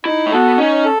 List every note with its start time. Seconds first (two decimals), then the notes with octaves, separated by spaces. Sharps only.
0.05 D#4 E4
0.26 A3
0.32 B3 F#4 A4
0.58 C#4 D#4
0.85 A4